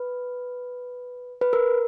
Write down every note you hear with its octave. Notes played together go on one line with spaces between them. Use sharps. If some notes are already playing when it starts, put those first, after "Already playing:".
Already playing: B4
B4
A#4